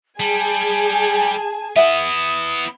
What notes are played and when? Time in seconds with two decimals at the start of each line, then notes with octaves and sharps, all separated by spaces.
0.20 G3 G#4 G#5 A5
1.76 B3 E4 E5 F#5 D#6